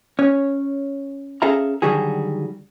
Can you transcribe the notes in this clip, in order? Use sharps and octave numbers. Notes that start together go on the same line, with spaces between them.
C#4 C#5
C#4 G#4 A4 E5 F5 A#5
D3 D#3 F#3 G3 F#4 G#4